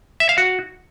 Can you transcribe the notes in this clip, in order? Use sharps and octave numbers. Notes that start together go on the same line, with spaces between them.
E5
F5
F#4